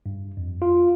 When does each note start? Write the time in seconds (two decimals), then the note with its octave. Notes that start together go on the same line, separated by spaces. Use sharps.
0.06 G2
0.37 F2
0.62 F4